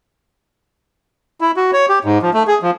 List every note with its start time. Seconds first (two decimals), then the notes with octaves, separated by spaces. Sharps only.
1.41 E4
1.57 F#4
1.73 C#5
1.89 G4
2.04 G#2
2.22 F3
2.34 A3
2.47 G#4
2.62 F3